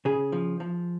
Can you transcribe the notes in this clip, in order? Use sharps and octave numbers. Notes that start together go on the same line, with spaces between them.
C#3 G#4
F3
F3